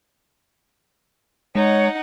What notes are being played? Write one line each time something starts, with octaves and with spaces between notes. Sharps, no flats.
G#3 D#4 C#5 F#5